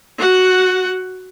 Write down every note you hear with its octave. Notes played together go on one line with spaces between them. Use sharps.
F#4 F#5